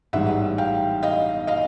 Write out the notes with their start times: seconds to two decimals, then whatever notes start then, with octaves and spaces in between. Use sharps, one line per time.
0.13 A1 G#2 E3 G3 E5 F#5
0.58 F5 G5
1.03 D#5 F5
1.47 D#5 F5